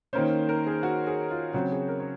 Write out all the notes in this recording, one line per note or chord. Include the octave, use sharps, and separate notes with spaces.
D#3 A#3 C#4 C5
A#4
G#4
F#4
G#4
F4
C#3 F#3 C4 F#4
G#4
A#4
C#5